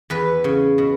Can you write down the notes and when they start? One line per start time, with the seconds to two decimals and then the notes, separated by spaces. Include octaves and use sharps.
0.10 E2 B4
0.44 C#3
0.78 B2